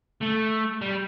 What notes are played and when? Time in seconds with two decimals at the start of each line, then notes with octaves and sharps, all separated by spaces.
0.22 A3
0.81 G3